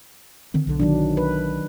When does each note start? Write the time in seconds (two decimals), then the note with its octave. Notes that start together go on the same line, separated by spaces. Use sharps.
0.54 D3 D#3 C4
0.67 B1 D3
0.80 D#3 F#3 D4
1.17 B4